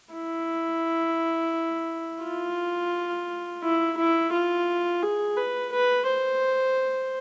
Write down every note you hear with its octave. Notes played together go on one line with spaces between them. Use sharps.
E4
F4
E4
E4
F4
G#4
B4
B4
C5